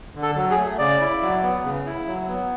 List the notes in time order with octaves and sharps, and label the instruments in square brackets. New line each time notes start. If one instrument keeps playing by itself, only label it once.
[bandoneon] D3
A4
F#3
G#4
A3
C#3 D5
E4
F#3
B3
C#3
E4
F#3
B3